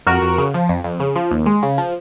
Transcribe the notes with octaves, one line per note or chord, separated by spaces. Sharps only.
F2 F#4 A#4
F2
C#3
F3
F2
F2
C#3
F3
D#2
G#3
C#3
F3